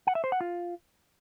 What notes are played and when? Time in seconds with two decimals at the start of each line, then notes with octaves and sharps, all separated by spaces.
0.07 F#5
0.15 E5
0.24 C5
0.32 F#5
0.41 F4